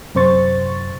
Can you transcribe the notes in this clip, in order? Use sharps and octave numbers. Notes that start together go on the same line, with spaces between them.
F#2 C3 C5 C#6 A6